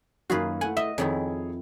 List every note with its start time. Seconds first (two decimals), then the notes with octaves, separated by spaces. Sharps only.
0.30 F#2 D#3 A#3 F4 F#4 G#4 B4
0.61 A3 E4 F#5 G#5
0.77 D#5 E5
0.98 F2 D#3 E4 G#4 C#5 G#5